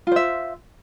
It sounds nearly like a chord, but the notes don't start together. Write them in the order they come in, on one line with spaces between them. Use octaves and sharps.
F4 C5 E5